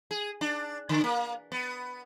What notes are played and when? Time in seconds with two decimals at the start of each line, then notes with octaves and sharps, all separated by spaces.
0.11 G#4
0.41 D4
0.89 D3
1.04 A#3
1.52 B3